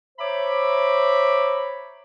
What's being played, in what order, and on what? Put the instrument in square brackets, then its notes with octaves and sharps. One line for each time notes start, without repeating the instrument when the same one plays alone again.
[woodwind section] C5 C#5 E5 A#5 B5 D6